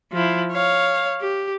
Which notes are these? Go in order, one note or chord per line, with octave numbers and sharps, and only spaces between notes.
F3 E4
C#5 F5
G4